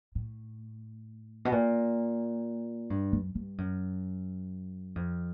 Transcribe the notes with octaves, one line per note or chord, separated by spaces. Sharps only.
A2
B2
A#2
G2
F#2
G2
F#2
F2